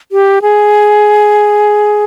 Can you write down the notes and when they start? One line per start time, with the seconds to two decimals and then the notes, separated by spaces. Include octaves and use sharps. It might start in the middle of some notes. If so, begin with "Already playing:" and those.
0.12 G4
0.42 G#4